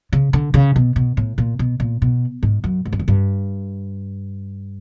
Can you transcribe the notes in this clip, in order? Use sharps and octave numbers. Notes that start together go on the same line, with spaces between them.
C#3
D3
C#3
B2
B2
A2
A#2
B2
A#2
B2
G#2
F#2
G#2
G2
F#2
G2